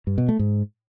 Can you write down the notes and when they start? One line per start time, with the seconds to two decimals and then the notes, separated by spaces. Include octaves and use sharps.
0.07 G2
0.18 B2
0.29 A3
0.39 G#2